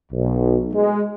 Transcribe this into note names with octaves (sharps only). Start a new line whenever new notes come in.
B1
G#3